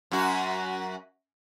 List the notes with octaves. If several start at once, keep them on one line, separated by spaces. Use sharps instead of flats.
F#2 F#4